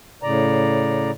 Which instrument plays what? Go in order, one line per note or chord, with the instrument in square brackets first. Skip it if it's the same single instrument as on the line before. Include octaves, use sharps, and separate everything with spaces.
[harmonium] A2 C#3 D5 A#5